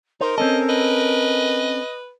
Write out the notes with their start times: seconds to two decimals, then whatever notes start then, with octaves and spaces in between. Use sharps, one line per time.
0.21 D#4 A#4 C5
0.38 C4 C#4 A4 D#5
0.69 B4 D#5